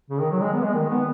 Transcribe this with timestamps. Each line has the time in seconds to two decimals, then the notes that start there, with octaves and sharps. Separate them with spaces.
0.10 C#3
0.21 D#3
0.32 F#3
0.42 G#3
0.53 B3
0.63 G#3
0.74 D#3
0.90 B3